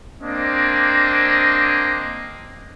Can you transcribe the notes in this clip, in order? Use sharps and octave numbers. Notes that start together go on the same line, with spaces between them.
A#3 C4 D4 D#5